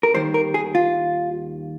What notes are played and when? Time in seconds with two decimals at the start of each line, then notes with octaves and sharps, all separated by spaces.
0.03 A#4
0.14 D#2 D#3 G3 C5
0.34 A#4
0.54 G#4
0.75 F4